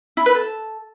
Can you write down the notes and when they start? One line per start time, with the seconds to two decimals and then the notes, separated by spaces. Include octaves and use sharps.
0.17 E4
0.26 B4
0.35 A4